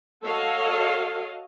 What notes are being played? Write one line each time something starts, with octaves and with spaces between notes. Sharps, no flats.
F#4 A4 C#5 D#5 F5